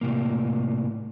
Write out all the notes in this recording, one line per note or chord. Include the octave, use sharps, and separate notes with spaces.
A2 C3 A#3